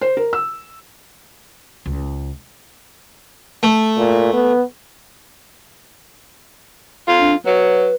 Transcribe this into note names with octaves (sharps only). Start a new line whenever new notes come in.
C5
A#4
E6
C#2
A3
A#2
B3
F2 F4
D4
F#3 B4